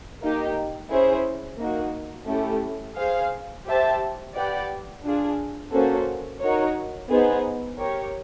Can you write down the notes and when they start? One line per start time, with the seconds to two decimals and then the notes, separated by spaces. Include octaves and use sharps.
0.21 A#3 D#4 G4
0.91 C#4 E4 G#4 C5 E5
1.59 A#3 D#4 F#4
2.28 A3 C#4 E4 G4
2.97 G#4 C5 F5
3.66 G4 C5 E5 A5
4.34 G4 B4 D5 F#5
5.04 D4 F4 G#4
5.72 A#3 C#4 F#4 A4 C5
6.41 D#4 F#4 A#4 C#5
7.10 B3 D#4 G#4 C5
7.78 G4 A#4 C#5